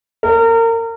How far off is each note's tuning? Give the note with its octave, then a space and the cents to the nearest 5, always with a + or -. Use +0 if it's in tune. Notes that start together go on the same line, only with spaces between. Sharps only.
A#4 -30